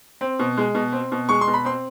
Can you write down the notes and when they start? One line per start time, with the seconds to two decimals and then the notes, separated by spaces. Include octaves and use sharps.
0.21 C4
0.39 B2
0.58 G#3
0.75 B2
0.92 C4
1.12 B2
1.29 G#3 C#6
1.41 C6
1.47 B2
1.54 B5
1.65 C4 C6